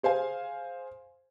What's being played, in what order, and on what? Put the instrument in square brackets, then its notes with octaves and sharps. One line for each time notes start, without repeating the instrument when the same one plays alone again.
[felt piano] G#4 C5 F5 G#5